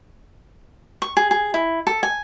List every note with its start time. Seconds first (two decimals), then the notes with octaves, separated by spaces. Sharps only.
1.02 C#6
1.17 G#4
1.31 G#4
1.54 E4
1.87 A4
2.03 G#5